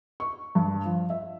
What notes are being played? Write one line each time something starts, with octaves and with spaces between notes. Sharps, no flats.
C#6
G2
F3
E5